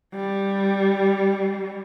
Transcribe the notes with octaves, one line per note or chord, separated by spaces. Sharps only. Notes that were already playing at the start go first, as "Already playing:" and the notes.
G3